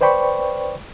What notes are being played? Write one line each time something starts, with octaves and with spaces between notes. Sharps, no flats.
B4 C5 D5 G5 B5 C#6